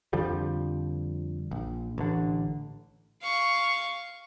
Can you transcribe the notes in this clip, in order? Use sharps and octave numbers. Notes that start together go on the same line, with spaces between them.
F2 D3 F3 G3
A#1
A1 D3
F5 C#6